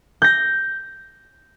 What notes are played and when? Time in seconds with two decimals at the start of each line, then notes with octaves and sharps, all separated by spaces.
0.22 G6 A#6